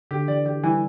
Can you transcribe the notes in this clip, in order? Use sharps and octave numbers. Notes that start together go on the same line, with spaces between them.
D3 G4
E3 D5
E3 G4
E3 G3